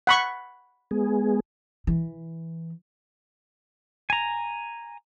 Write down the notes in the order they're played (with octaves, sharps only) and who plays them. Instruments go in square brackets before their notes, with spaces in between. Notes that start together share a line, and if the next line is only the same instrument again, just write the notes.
[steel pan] F#5 B5 C#6
[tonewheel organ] G#3 B3 G#4
[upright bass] E3
[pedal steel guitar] G#5 A#5